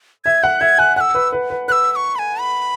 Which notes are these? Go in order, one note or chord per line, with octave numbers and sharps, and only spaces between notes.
E5 G#6
F#5 F#6
E5 G#6
G#5 F#6
F#5 E6 F#6
B4
B4
B4
B4 E6 F#6
E6
C#6
B5
G#5
B5